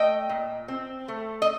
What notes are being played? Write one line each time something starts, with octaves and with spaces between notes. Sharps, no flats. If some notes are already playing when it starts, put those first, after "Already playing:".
Already playing: A3 D#5 G5
A#2
C4
A3
D#5